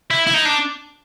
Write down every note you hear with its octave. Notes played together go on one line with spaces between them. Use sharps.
E4
E4
D#4
D4